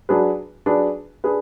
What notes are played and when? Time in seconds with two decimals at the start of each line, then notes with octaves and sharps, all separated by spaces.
0.09 F#3 D4 G#4 B4
0.66 F#3 D4 G#4 B4
1.24 D4 G#4 B4